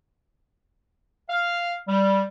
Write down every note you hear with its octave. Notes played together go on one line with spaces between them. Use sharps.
F5
G3